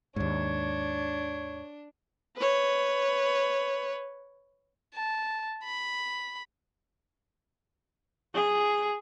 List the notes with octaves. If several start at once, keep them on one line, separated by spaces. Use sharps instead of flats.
D#2 G#2 D4 C#5
B4 C#5
A5
B5
G#4